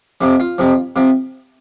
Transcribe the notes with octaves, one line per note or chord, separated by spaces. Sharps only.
F2 C3 F3
F4
F2 C3 F3
C3 F3